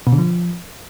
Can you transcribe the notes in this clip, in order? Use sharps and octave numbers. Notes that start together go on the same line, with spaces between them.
B2
D3
F3